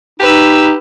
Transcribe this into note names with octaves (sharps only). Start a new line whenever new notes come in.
D#4 G4 B4 E6